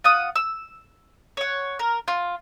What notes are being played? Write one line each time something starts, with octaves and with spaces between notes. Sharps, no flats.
F4 F#5 D#6
E6
C#5 F#5
A#4
F4